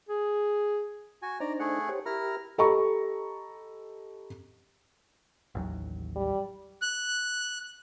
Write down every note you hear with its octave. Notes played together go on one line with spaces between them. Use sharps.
G#4
F#4 G#5
D4 D#4 C5 D5 A#5
A3 G#4 F#5
G4 C5 C#5
E4 G4 A#4 A#5 F6
G4 A4 D#5 A#5 B5 C#6
A1 D#2 F#3
G3
F#6